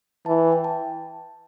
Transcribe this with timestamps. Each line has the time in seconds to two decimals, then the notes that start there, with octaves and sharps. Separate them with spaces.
0.26 E3 A5
0.52 G5
0.64 A5